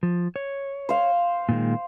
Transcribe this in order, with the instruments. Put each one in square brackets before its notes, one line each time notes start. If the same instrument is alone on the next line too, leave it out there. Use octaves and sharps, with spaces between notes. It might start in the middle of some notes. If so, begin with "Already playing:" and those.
[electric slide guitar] F3
C#5
[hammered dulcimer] C5 F5
[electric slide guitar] A#2 D#3 G#3